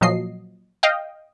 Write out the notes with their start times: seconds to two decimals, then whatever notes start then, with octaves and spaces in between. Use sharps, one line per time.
0.01 A#2 F3 F#3 D#5 C7
0.83 D#5 F5 G5